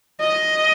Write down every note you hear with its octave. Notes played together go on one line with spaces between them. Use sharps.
D#5